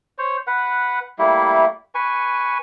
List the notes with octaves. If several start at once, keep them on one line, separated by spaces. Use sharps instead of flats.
C5 C#5
B4 F#5
G3 A3 A#3 E4
B4 G#5 C#6